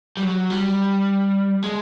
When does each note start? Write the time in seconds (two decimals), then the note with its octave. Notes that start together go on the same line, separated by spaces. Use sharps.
0.17 G3
0.23 F#3
0.50 G3
1.64 G#3